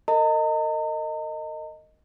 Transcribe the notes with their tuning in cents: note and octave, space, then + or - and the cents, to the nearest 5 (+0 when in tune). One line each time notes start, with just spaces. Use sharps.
A#4 -35 D#5 +0 A#5 -40